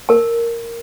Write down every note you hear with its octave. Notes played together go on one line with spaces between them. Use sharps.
A#4 A5